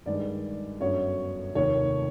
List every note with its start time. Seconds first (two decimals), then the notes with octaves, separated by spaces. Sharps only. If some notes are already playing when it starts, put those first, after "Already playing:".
0.06 G2 D#3 G#3 D5
0.81 G1 F#2 D3 F#3 C#5
1.55 F1 D#2 D#3 C#5